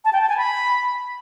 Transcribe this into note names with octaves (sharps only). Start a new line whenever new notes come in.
A5
G5
A5
G#5
B5